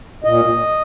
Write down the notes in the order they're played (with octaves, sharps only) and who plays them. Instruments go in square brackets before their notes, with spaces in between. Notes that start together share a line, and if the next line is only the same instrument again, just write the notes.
[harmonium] A#2 D#5